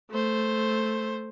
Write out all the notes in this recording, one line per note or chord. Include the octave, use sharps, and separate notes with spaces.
A3 C5